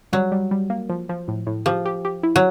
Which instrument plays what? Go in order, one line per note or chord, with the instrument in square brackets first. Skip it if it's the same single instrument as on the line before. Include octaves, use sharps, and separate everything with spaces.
[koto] F#3 [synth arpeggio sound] G3
[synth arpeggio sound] G3
G3
A#3
F3
F3
A2
A2
[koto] F3 [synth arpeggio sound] G4
[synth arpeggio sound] G4
G4
E4
[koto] F#3